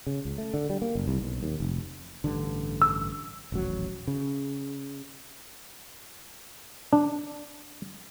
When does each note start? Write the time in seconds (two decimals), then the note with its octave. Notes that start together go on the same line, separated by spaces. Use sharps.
0.07 C#3
0.25 C#2
0.38 A3
0.54 D3
0.70 G3
0.82 A#3
0.95 F#1
1.08 C2
1.22 B1
1.43 D#2
1.60 F1
2.24 A1 G2 D3
2.82 E6
3.52 D#1 A1 F#3
4.07 C#3
6.93 D4